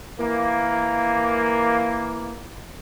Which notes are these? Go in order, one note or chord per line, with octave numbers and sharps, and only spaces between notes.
E3 A#3